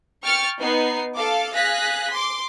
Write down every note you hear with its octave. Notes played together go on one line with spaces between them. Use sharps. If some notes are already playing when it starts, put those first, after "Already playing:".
G5 C#6 F6 A6 C#7
B3 D#4 C7
A4 F5 D6
G#4 F5 F#6 A#6 B6
C6 D6